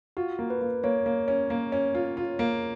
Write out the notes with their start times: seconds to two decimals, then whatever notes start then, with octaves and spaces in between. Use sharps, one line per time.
0.17 F4 F#4
0.39 A#3
0.50 B4
0.61 A#3
0.84 A#3 C#5
1.06 A#3
1.28 C#4
1.50 A#3
1.72 C#4
1.95 F4
2.17 F4
2.39 A#3